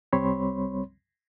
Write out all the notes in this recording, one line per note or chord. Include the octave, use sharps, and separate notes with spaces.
C2 G3 C4 C#5 B5 C6